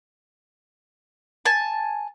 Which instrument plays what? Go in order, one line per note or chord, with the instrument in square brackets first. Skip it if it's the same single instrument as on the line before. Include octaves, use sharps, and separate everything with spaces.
[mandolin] G#5 A5